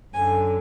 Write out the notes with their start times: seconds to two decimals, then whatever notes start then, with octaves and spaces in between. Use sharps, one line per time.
0.13 F#2 D3 G#5